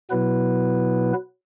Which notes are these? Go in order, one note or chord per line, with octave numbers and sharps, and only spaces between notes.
B2 F#3 B3 E4 B4